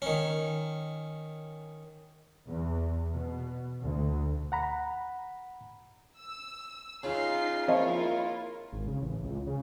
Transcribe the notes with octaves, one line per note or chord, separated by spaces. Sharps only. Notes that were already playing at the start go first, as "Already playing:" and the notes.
D#3 C#4
E2
B2
D2
F#5 A#5 B5
E6
C#3 D#4 F4 C7
D#2 F3 C4 E4 F4 A#4 C#5 D#5
G#1
C#3
A1
C#2
C#3